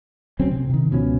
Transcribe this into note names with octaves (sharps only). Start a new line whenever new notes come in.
D2 F#3 C4 C#4
C3
C3 D#3
C#2 B2 F3 C#4